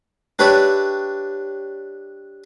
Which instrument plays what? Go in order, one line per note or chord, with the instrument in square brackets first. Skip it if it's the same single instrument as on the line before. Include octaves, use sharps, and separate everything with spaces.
[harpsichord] D4 G4 B4 C#5 D5 E5